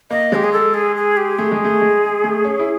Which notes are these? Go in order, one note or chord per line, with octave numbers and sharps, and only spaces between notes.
A#3 D#5
G#3 G4
G#4
A4
G#4
G#4
G4
A3 G#4
G#3
A3
G#3
A3
C#4
E4